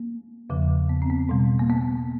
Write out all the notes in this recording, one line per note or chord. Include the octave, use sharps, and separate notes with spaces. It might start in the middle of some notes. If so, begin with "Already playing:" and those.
Already playing: A#3
E2 C#3 F3
B3
C4
B3
B2 G3
A#3
B3